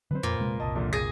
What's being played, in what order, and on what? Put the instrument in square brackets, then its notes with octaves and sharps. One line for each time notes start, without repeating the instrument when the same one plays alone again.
[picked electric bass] D3 F#3 C4 [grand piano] B4 C5
[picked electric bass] F2 [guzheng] A#2
[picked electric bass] E1 C3 G#3
[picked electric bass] F#1 C2 [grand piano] D#5 A5 D#6
[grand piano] A#1 A#2 D3
[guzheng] G#4 [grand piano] A#6 D#7